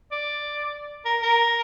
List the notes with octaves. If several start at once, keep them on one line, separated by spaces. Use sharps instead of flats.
D5
A#4
A#4